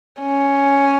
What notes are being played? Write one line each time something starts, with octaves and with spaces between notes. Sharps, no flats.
C#4